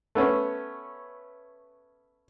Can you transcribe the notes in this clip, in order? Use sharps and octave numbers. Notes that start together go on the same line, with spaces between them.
A3 B3 C#4